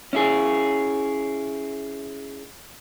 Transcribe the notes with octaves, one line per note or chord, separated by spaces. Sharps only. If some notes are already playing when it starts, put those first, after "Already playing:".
C#4 E4 G#4